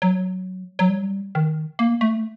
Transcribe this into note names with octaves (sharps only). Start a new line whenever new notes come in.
F#3
F#3
G3
D#3
A#3
A3